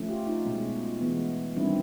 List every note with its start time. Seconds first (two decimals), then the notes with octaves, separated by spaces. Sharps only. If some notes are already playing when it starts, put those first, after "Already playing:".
Already playing: F3 A3 C#4
0.09 F4 G4
0.27 D#4 F4
0.45 B2 G#3 C#4
1.01 E3 G#3 B3
1.56 D#3 G3 C4 D4 E4